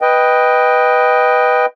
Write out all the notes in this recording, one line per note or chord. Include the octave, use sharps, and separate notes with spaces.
B4 D#5 G5